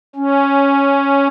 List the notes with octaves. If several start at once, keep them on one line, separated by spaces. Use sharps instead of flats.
C#4